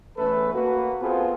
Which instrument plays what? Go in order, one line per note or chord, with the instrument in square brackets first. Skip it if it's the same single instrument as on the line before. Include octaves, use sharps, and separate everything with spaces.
[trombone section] E2 A3 C#4 A4 B4
A#3 F#4 B4
B3 C4 F4 G#4 A4 B4